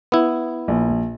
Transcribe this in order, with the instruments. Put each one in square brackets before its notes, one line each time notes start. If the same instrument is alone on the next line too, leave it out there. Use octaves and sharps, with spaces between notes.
[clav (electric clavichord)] B3 E4
[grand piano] A#1